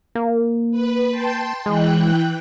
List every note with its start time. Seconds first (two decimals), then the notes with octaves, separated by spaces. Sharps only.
0.15 A#3
0.71 B4
1.11 G5 A5 C6
1.66 E3 G#3 G5 F#6